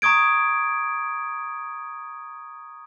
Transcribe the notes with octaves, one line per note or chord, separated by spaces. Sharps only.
A#5 C#6 D#6 G#6 D7